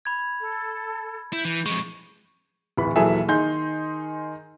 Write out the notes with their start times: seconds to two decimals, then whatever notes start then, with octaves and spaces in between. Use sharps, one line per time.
0.05 B5 G#6
0.40 A4
1.33 E4 G6
1.45 E3
1.66 F2 G#3 C#6
2.77 D1 E3 B5
2.96 D#1 E3 F#3 G#4 A4 E5
3.28 D#3 D#4 G#4 C6 G6